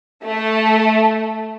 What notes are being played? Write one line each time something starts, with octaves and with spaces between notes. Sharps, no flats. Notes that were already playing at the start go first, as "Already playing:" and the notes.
A3